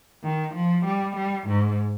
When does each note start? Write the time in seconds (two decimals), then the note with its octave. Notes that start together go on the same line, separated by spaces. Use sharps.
0.23 D#3
0.54 F3
0.85 G3
1.16 G3
1.47 G#2